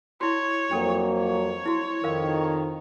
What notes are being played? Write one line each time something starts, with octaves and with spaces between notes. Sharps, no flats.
E4 F#4 C#5
F2 F#3 A#3 D4 A4
C#5
E4 F#4
F2 D#3 A#4 F5